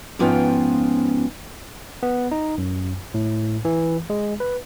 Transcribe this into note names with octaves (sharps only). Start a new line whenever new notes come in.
G#2 F3 B3 C#4 F4 G5
B3
D#4
F#2
A2
E3
G#3
B4